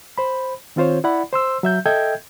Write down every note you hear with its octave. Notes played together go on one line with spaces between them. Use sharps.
C5 B5
D#3 C4 F4 C5 C#5
E4 D5 F#5 B5
C5 C6 E6
F#3 E5 G6
A4 D#5 E5 G5 G6 G#6